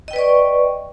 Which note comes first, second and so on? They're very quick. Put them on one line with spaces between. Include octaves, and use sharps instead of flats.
D#5 G5 B4 D5 C#6